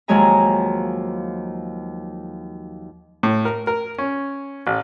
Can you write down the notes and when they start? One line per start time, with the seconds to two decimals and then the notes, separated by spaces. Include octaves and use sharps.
0.08 D#2 F3 F#3 G#3 G#5 A#5
3.23 A2
3.45 A#4
3.67 A#4
3.98 C#4
4.67 A1